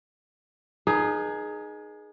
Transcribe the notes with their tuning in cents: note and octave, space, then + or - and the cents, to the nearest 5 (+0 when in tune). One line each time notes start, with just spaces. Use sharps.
D#4 -20 G#4 +15 B4 -45